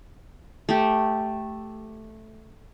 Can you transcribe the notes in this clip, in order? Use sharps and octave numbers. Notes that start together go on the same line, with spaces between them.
A3 G4